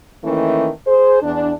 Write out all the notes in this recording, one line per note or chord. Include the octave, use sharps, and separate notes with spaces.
D#3 E3 A3 A#3 C#4
G#4 C5
E2 D4